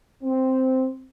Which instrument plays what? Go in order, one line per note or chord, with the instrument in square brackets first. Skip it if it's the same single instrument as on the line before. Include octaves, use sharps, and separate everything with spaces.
[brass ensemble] C4